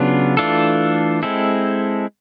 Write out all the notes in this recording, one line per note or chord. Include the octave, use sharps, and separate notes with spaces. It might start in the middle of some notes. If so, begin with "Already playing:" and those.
Already playing: C#3 F#3 B3 D4 F4
E3 A3 D4 F4 A4
G#3 C4 E4 A4